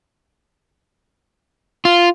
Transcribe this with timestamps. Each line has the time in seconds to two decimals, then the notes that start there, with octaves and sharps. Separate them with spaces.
1.85 F4